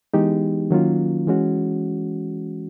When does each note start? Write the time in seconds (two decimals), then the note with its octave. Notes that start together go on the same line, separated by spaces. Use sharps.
0.14 E3 G#3 B3 D#4 G4
0.71 D#3 F#3 A#3 C#4 F4
1.27 E3 G#3 C#4 F#4